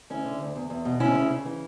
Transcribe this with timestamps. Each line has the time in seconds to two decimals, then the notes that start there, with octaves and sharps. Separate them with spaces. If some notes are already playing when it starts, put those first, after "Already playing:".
0.10 D2 C#4 E4
0.25 D3
0.40 D2
0.55 E2
0.70 E2
0.85 B2
1.00 D2 C#4 E4
1.15 C#3
1.31 C#3
1.45 E3